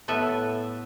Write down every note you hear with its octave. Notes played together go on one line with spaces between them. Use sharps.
A2 B3 A4 B4 E5